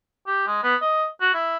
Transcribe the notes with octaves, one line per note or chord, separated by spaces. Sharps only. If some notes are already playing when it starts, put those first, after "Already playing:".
G4
G#3
B3
D#5
F#4
E4